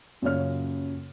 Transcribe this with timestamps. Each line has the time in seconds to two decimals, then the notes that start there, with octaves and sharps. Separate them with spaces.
0.22 F#2 A#2 C#3 C#5 F6